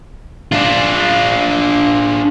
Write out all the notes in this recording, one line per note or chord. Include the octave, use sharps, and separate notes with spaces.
D4 F4